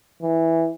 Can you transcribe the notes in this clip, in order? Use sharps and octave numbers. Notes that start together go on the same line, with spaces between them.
E3